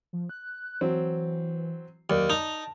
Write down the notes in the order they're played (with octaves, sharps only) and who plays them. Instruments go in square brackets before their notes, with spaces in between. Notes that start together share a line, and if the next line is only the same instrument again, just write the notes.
[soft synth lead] F3
F#6
[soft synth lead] E3 [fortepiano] F#3 C4
[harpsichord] D#2 [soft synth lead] F#3 [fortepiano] D5
[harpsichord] D#4 [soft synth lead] A5